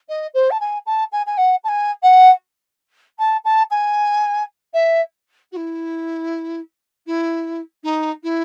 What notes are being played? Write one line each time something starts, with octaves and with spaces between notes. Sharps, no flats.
D#5
C5
A5
G#5
A5
G#5
G#5
F#5
A5
G#5
F#5
A5
A5
G#5
E5
F#4
E4
E4
D#4
E4